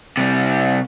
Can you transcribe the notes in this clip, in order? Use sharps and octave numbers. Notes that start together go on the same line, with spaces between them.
C3 G3